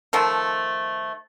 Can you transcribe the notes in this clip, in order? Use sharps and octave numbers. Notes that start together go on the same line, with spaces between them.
D#3 F3 A3